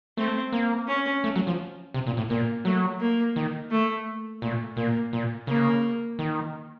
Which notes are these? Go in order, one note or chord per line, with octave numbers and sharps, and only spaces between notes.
A3 C4
A#3
C#4
A3
F#3
F3
C3
A#2
A2
A#2 A#3
F#3 A3
A#3
D#3
A3
A#2 A3
A#2 A#3
A#2
C#3 A#3
D#3